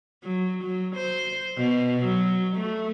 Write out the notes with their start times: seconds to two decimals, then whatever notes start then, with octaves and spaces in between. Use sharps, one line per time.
0.24 F#3
0.63 F#3
0.96 C5
1.57 B2
2.05 F#3
2.56 A3